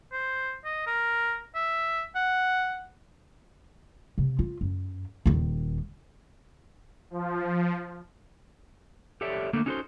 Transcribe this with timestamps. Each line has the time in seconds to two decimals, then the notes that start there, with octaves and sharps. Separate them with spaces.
0.12 C5
0.65 D#5
0.86 A#4
1.55 E5
2.16 F#5
4.18 C3
4.39 F4
4.61 F#2
5.26 D#1 D#3
7.11 F3
9.21 G4 A4 C#5 D5 E5
9.53 D3 A3 A#3
9.66 C#4 D#4 F#4 G4 A4 C5